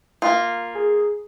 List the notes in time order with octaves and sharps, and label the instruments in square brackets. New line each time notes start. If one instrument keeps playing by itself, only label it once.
[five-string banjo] A#3 F4
[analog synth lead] G#4